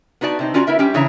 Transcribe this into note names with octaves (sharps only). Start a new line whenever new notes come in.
B3 D#4 F#4 D5 A5
C3 C4 D#4
C#4 F4 F#4 D5 G5 A#5
B3 E4 A#4 E5
G3 C#4 G4 G5
C#3 E3 D4 C#5 E5 A#5